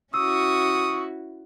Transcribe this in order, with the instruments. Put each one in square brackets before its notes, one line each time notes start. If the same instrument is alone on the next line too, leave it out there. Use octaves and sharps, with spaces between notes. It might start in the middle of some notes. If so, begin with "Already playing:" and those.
[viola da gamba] C#4 E4 F#4 [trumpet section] C#6 [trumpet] D#6 [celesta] E6